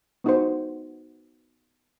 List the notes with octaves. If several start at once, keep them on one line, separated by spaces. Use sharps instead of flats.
B3 D#4 F#4 C5